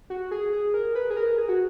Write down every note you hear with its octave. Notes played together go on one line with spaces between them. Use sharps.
F#4
G#4
G#4
A#4
B4
G#4
A#4
G#4
F#4